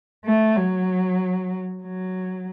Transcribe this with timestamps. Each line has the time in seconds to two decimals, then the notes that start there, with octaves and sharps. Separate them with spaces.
0.25 A3
0.56 F#3
1.83 F#3